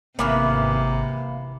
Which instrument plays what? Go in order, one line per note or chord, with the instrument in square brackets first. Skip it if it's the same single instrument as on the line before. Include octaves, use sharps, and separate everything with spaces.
[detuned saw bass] G#1 [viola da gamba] C3 [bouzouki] E3 B3 B4 [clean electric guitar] A#3